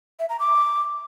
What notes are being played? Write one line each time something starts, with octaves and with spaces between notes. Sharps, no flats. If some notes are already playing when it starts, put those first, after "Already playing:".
E5
A#5
D6